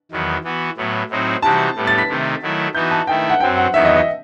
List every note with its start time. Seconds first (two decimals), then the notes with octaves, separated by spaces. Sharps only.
0.11 E2 D#3 F#3 B3
0.44 E3 B3 F#4
0.77 A2 F#3 B3
1.09 A2 F#3 C4 D#4 F#4
1.42 C3 E3 G3 D#4 F#4 A5
1.75 A2 G3 B3
1.87 A6
1.98 B6
2.08 C3 D#3 A3 D#4
2.42 D#3 F#3 A3 E4
2.75 E3 B3 D#4 F#4 G6
2.91 A5
3.07 D#3 A3 E4 G5
3.29 F#5
3.40 F#2 F#3 C4 G5
3.57 F#5
3.74 E2 D#3 F#3 B3 E5
3.85 D#5
3.96 D#5